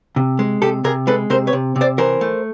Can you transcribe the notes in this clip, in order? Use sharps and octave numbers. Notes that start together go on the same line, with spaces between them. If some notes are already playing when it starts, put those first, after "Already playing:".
C3
G#3
C3 G4 A4
C3 G#4 A#4
G#3 A4 B4
C3 A#4 C5
B4 C#5
C3
C3
C5 D5
E3 A#4 C5
A3